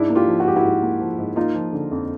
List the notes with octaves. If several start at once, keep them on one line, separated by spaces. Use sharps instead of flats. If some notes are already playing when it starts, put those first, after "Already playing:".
Already playing: G#2 D4 E4
A#3
F4 G4
F3
F#4
G#2 G4
E4 F#4
G#2
A#3
F3
G#2
A#3 D#4 F4
F3
D3
F2